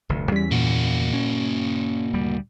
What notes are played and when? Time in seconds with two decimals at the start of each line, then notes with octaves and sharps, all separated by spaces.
0.09 F1 D2 G2
0.32 E2 E3 G3 C#4 B6
0.51 A#2 A#3 F#4
1.13 C#4
2.14 D2 G3